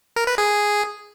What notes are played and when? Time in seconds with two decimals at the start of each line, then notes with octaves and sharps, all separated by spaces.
0.16 A#4
0.27 B4
0.38 G#4